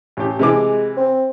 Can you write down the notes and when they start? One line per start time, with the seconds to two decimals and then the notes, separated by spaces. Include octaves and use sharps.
0.17 A1 G4
0.39 C3 E3 G#3 D6
0.97 C4